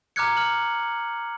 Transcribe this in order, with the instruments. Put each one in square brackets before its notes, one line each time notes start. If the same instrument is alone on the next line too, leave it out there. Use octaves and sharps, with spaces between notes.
[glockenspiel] A#5 D6 F6 F#6 G#6 C#7
F6 F#7